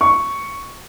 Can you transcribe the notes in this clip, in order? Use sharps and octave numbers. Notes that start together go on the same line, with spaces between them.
C#6